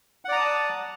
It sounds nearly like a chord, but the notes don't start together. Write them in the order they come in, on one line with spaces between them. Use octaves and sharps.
F#5 D5 A#5 D#6 A5